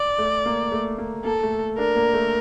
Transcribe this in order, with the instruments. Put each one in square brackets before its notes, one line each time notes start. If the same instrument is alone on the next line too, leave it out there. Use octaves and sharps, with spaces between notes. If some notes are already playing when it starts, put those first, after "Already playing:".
Already playing: [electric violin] D5
[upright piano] A3
A#3
A3
A#3
[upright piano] A#3 [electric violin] A4
[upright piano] A3
[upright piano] D4 [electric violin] A#4
[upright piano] A#3
A3